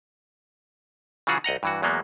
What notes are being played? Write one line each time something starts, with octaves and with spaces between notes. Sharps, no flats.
C#3 E3 F#3 F4 F#4 G#4
C2 D#5 F#5 A#5
G2 E3 F#4
E2 F#3 G#3 A#3 B3